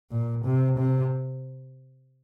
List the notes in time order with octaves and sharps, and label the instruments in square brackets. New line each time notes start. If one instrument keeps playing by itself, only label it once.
[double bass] A#2
C3
C3